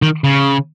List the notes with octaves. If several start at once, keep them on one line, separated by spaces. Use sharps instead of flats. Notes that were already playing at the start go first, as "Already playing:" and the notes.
D#3
C#3